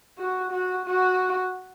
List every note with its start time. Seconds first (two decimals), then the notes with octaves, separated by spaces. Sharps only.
0.18 F#4
0.51 F#4
0.86 F#4